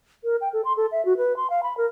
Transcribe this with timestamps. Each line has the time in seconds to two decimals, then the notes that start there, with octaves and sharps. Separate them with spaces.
0.24 A#4
0.41 G5
0.53 A4
0.65 C6
0.77 A4
0.92 E5
1.05 F#4
1.18 B4
1.37 C6
1.50 F5
1.63 B5
1.77 A#4